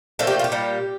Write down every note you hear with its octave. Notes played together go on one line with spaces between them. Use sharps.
A#2 F3 A3 A4
G4
F4
G4
A#2 G3